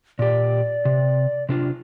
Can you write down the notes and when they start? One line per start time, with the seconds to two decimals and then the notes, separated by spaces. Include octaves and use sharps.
0.19 A#2 G4 D5
0.85 C3
1.49 C3 D4 F4